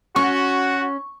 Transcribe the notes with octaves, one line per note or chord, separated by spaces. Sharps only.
C#4 F#4 C#6